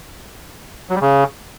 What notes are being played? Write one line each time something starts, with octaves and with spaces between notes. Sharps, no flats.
F#3
G3
C#3